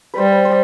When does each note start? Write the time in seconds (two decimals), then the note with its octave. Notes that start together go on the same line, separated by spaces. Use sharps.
0.14 G3 B4 C5
0.45 C5